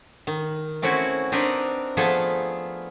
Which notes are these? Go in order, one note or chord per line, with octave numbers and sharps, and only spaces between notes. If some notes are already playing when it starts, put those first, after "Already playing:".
D#3
A3 C4 C#4 E4 F#4
C4 D4 D#4 A#4 B4
F3 A3 B3 G#4 A4